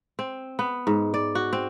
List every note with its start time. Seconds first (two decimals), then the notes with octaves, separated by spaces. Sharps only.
0.19 C4
0.59 B3
0.87 G#2
1.14 D5
1.35 F#4
1.53 C4